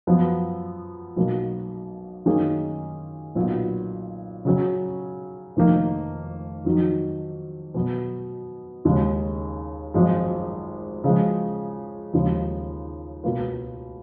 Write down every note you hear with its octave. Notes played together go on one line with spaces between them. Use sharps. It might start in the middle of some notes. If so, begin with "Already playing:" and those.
F#2 F3 B3
B1 B2 A#3
F#2 D#3 A#3 C#4 G#4
B1 A#2 F#3 B3
C#3 F#3 C#4
F1 F2 D#3 A#3
F2 D#3 F#3
B2 F#3 B3
D#2 C#3 G#3
G#1 F#2 F3 G#3
C#3 F3 G#3
D#2 C#3 F3 G#3
C#2 B2 A#3 F4 B4